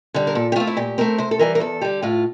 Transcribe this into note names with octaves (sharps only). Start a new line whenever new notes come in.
D3 G3
A#4
A#2 A4
G4
A3 C4 F4
E4
A#2 G4
A3 C4 A#4
C3 C5
A4
E3 G3 A#4
A#4
E2 A4
D3 G3 G4
A2 F4